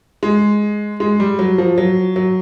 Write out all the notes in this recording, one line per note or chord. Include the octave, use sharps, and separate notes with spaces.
G#3
G#3
G3
F#3
F3
F#3
F#3